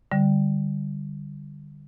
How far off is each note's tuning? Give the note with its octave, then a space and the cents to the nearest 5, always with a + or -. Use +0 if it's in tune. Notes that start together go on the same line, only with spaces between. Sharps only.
D3 +0 G3 +0